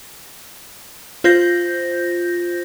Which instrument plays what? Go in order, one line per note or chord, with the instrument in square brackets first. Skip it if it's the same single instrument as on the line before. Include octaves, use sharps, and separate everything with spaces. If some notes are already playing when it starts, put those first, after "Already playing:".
[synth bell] F4 C5 G6 A#6